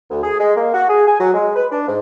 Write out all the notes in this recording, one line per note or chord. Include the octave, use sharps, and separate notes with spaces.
D2
G#4
G#3
A#3
F#4
G#4
G#5
F#3
G#3
B4
D4
G#2